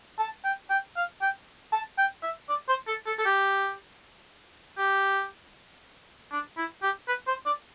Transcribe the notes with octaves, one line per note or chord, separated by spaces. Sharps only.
A5
G5
G5
F5
G5
A5
G5
E5
D5
C5
A4
A4
A4
G4
G4
D4
E4
G4
B4
C5
D5